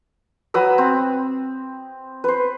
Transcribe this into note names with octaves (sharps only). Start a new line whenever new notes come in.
F#3 B4 D#6 E6
C4
B4 C5